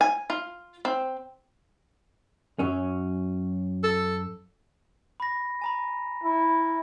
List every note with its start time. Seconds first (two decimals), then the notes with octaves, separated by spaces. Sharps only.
0.01 G#5
0.30 F4
0.85 C4
2.59 F#2 F#3 C#4
3.83 A4
5.20 B5 A#6
5.61 G#5 A#5 B5
6.24 E4